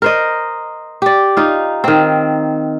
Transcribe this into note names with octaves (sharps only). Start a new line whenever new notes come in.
A#4 C5 D#5
G4 D5
D#4 F4
D#3 C4